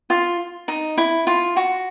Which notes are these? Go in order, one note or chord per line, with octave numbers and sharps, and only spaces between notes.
F4
D#4
E4
F4
F#4